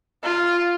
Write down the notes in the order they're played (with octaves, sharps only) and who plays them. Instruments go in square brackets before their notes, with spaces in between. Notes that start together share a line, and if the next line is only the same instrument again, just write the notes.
[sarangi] F4